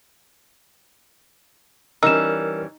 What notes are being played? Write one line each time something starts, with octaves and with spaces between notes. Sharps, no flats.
E3 G3 C#4 D#4 A#4 E6 F6 E7